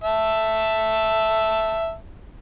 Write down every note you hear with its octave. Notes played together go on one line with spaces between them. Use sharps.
E5 A5